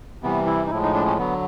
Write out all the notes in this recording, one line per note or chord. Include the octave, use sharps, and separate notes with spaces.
C3 E3 G3 B3
E4
D#4
A2 F3 G#3 E4
D#4
D4
C#4
D3 F#3 B3